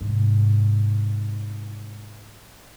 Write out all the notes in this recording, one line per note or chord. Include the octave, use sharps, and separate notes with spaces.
G#2 C3